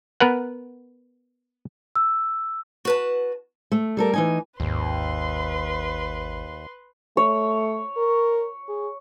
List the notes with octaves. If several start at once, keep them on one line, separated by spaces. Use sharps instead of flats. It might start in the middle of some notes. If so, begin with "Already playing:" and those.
B3 A#4 B4 F#5
E6
F#4 B4 A5
A3
G3 A4 A#4
E3 D#4 G#5
G#1 D#2 B4 C6
A3 C#5
A#4
G#4